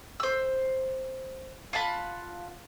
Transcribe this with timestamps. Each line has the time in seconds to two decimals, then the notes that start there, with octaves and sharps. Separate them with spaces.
0.20 C5 E6
1.73 F4 F#5 A5 B5